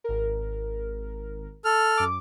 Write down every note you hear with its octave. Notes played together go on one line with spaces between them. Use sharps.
G#1 A#4
A4 F6
F#2 D6